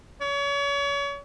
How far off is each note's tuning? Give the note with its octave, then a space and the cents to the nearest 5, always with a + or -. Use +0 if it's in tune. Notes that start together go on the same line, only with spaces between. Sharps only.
C#5 +35